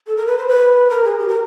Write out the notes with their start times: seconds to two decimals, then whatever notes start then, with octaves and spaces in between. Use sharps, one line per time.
0.07 A4
0.17 A#4
0.27 B4
0.38 C5
0.48 B4
0.90 A#4
1.05 G#4
1.19 G4
1.28 A#4